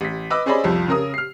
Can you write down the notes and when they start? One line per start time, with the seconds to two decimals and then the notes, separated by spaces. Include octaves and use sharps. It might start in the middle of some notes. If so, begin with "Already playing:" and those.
0.01 A1 B6
0.30 B4 D#5 B5 D6 E6
0.46 C#4 G#4 C5 D5 D#5 B5
0.64 C2 F2 F3
0.88 C#3 A#4 D#6
1.14 F6 C7